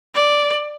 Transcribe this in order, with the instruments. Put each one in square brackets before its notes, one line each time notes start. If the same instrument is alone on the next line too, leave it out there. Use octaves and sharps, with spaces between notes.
[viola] D5